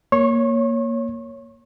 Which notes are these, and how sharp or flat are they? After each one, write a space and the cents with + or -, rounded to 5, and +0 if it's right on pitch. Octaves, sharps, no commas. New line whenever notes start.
A#3 +0 C#5 +0 C#6 -40